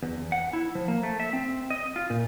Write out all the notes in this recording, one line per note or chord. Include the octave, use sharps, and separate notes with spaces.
E2
F#5
E4
F3
A#3
A3
E5
C4
D#5
F4
A#2